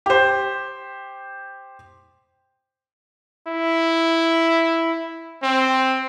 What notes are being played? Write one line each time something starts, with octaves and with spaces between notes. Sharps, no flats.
G4 C5
E4
C4